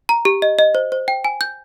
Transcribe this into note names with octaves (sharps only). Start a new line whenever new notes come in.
A#5
G4
D#5
D#5
C5
C5
G5
G#5
G6